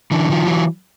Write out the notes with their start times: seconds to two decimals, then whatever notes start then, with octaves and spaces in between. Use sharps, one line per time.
0.11 D3 E3
0.30 D#3 F3
0.47 E3 F#3